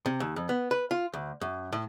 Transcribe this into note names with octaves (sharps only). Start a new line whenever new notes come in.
C3
D#2
F2
B3
B4
F4
D2
F#2
A2